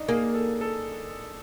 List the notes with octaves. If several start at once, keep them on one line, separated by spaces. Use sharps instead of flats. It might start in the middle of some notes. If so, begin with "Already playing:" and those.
Already playing: D4 D#4
A#3 G#4
A4
A4